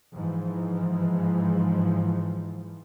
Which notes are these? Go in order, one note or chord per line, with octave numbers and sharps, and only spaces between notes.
G#2 E3 F3